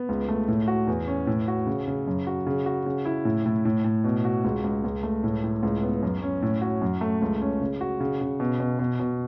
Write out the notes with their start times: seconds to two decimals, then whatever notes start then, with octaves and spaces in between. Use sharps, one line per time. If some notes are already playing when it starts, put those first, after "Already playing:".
Already playing: B3
0.09 C#2
0.28 A3
0.48 A2
0.68 F#4
0.87 E2
1.08 C#4
1.27 A2
1.48 F#4
1.66 C#3
1.87 C#3
2.07 F#2
2.27 F#4
2.47 C#3
2.66 F#4
2.86 C#3
3.06 E4
3.25 A2
3.46 A2
3.65 A2
3.84 A2
4.04 B2
4.25 F#4
4.44 C#2
4.64 C#2
4.84 C#2
5.03 A3
5.24 A2
5.44 A2
5.63 C#2
5.83 B3
6.03 F#2
6.22 C#4
6.42 A2
6.61 F#4
6.82 F#2
7.01 A3
7.22 C#2
7.42 C#4
7.61 C#3
7.81 F#4
8.00 C#3
8.21 C#3
8.40 B2
8.60 B2
8.79 B2
9.00 B2